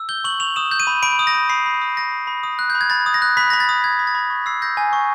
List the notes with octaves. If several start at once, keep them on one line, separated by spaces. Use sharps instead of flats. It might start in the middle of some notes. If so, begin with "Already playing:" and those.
Already playing: E6
G6 G7
C#6 F#7
C#6 F7
D#6 E7
G6
D#7
B5
B5 D7
D#6
A#6
G6
B5 C7
B5
D#6
G6 A#6
B5
B5
D#6
F#6
G6
B5
G#6
B5 A6
D#6
A#6
F#6
B5 B6
B5 A#6
A6
D#6
F#6 G#6
B5
A6
B5
C#6
E6 C7
G6 A#6
G#5
C#6